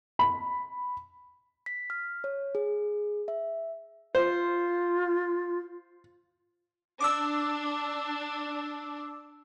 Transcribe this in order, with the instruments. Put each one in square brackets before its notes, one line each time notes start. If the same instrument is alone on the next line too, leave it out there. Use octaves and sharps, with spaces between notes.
[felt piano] B5
[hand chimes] B6
F6
C#5
G#4
E5
[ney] F4 [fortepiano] C5
[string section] D4 [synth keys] D6 E6